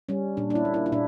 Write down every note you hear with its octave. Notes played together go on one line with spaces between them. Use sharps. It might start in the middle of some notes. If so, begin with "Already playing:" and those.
G3 C#4
A#2 D4
D4
E4
A#3
E4
E4
A#2 D4